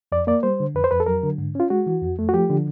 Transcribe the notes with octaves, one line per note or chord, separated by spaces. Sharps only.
F2 D5
A#3 D5
G3 C5
D3
F2 B4
C5
F2 B4
A4
F#3 A#4
D3
G#2
C#4 F4
G#3 F#4
E3
F2
A3
F#4
F3 G4
D3